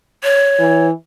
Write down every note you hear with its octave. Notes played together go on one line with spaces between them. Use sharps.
C#5
E3